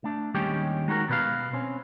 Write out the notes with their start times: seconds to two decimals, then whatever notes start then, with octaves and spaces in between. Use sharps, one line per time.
0.04 A3 D4
0.34 D#2 G3 G#3 C#4 G4 G5
0.88 G#3 D#4 F#4 G4 A#4
1.09 B2 B4 F5
1.53 C4 C#4